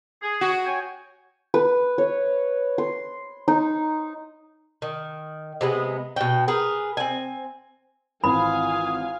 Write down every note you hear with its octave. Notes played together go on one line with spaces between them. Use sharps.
G#4
F#4
C#5 G5 G#5
B4
C#5
C6
D#4
D#3
C3 G#3 B3
B2 D4 G5
G#4 A#4 B4
C4 G#5
G#1 E3 C4 F4 F5 G#5 B5 D#6